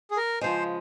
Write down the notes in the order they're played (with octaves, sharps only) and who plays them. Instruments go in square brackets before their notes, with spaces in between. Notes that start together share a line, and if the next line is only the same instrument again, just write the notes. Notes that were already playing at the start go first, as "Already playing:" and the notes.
[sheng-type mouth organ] G#4
A#4
[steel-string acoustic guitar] C#3 F3 G#3 [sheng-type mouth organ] C5